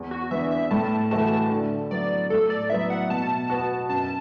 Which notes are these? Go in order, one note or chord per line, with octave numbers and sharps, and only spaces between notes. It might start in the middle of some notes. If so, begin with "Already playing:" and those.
Already playing: E2
F#4
E3 B3 D4 E5
E5
A2 A5
E3 A3 F#4 A5
D3
F#3 B3 E4 D5
A2 A4
D5
F#3 B3 E4 E5
F#5
B2 A5
B3 F#4
F#2 A5